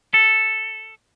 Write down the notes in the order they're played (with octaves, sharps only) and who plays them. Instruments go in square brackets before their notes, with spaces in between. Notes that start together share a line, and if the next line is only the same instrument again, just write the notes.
[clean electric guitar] A4